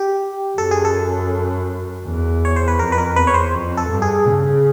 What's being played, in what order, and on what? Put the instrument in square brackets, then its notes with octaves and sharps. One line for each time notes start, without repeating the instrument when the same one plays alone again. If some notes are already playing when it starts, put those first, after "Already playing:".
Already playing: [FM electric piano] G4
[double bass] F#2 [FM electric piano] A4
[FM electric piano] G#4
A4
[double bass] E2
[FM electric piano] C#5
C5
B4
[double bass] F2 [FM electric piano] A#4
[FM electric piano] B4
A#4
[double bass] E2 [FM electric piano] B4
[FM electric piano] C#5
C5
[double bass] F2
[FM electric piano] A4
[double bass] G2
[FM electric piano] G#4
[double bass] C#3